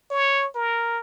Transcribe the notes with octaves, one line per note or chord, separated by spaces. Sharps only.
C#5
A#4